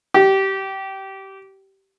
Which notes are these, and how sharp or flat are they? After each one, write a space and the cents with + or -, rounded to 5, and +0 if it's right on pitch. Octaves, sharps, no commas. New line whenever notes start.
G4 -20